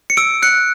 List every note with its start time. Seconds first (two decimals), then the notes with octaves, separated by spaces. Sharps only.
0.10 C#7
0.17 E6 D7
0.42 F#6 C#7